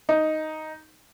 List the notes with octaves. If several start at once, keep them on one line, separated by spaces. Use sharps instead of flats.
D#4